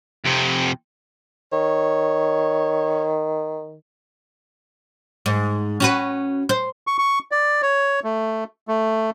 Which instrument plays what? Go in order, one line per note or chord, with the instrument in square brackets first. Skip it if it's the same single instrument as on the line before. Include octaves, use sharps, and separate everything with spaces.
[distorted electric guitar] F2 C3
[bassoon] D#3 [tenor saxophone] C#5
[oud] G#2
C#4 F#4 B4
C5
[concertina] C#6
C#6
D5
C#5
A3
A3